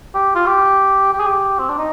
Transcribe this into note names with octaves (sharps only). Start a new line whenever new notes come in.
G4
F4
G4
G4
G#4
G4
C4
D4
D#4